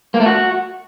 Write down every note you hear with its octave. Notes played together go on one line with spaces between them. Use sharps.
A#3
A3
F#4